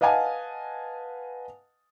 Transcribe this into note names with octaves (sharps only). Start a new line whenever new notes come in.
B4 D#5 F5 F#5 G#5 A5